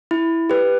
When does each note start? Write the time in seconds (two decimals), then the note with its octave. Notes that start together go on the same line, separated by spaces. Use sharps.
0.11 E4
0.50 G4 B4